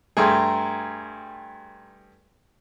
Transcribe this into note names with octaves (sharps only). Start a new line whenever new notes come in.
G2 A3 G#4 G5 A#5 C6